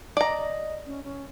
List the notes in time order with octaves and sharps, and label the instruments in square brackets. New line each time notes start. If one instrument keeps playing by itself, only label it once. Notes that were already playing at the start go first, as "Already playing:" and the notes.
[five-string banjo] D5 A#5 [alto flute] D#5
[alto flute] C#4
C#4